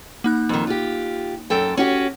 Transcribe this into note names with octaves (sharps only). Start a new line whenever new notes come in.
A#3 D#4 F#6
F2 D#3
F4 G4
F#2 A4 G5
C#4 F#4 G4